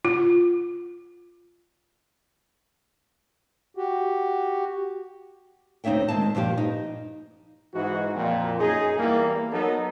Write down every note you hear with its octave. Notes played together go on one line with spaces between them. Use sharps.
F4
F#4 G4
D2 C4 D#4 C#5 E5 G5
D#3 G#3 C4 A5
G2 A#2 F3 G4
D#4
G#2 E3 D#4 F#4
F2 A#2
F#2 D#4 G#4
E2 E3 G3 A#3
F#3 B3 D#4 A4 A#4